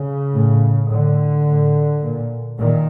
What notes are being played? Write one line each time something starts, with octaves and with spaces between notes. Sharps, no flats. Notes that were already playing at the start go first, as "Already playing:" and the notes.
Already playing: C#3
A2
A2 D3
A2
A#2
A#2 D#3